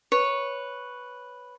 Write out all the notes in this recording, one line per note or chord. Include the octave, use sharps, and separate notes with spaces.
B4 C#5